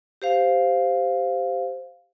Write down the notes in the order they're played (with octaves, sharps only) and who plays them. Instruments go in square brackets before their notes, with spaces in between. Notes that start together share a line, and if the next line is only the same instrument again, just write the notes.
[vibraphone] G4 C5 F5